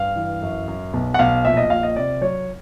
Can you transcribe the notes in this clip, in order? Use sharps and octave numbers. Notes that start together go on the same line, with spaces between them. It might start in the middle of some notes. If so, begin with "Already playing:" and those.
Already playing: G2 F5
E3
F#2
F#2
B1
F#5
B1 F5
A#1 E5
D#5
A#1 F5
D#5
C3 D5
F#3 C#5